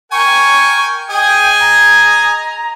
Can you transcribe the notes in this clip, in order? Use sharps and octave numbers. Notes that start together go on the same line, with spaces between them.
A#4 G5 G#5 C#6
G#4 D#5 G5 G#5
A#5